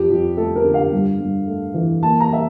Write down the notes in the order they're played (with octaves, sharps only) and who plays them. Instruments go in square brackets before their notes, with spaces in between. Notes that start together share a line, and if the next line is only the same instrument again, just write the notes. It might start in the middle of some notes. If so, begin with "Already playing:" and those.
Already playing: [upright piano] F2 G4
F2
A3 A4
A#4
D3
F5
G2
G2
A3
E3
A#3 A5
A#5
E5